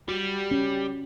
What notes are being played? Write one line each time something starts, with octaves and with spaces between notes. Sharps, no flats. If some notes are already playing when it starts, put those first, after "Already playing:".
G3 F#4
C#4